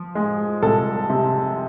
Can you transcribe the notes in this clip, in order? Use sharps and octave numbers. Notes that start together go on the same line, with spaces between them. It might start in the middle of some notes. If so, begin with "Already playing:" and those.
Already playing: F3
G#3
C2 A4
C3